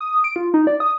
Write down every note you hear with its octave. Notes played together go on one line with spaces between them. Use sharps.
D#6
D7
F4
D#4
D5
D#6